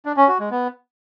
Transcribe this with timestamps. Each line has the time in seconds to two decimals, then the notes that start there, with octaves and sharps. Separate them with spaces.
0.05 D4
0.17 C#4
0.28 F#4
0.39 G#3
0.51 B3